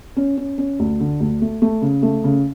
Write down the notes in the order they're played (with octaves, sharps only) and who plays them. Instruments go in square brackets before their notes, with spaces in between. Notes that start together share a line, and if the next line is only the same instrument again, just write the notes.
[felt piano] C#4
C#4
C#4
D2
D3
D2
A3
A3
C#3
A3
C#3